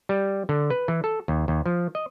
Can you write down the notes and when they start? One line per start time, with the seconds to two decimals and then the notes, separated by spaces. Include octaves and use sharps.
0.09 G3
0.49 D3
0.70 B4
0.88 E3
1.04 A4
1.28 D#2
1.48 D#2
1.66 F3
1.95 D#5